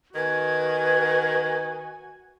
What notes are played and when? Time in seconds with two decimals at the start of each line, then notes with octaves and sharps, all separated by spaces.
0.15 D#3 F#4 B4 G#5 G#6